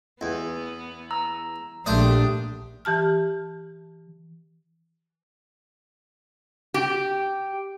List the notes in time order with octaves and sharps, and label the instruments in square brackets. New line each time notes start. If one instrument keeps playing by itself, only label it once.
[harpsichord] E2 [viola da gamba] B3
[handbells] A#5 E6
[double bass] A#1 [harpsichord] A3 C5 D5 [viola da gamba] D4 G4 [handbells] D#6
[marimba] E3 G4 A5 F6
[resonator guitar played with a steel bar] G4